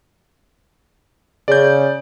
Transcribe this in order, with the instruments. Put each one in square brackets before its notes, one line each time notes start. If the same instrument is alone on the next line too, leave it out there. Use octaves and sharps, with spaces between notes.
[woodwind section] C#3 [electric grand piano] D5 G6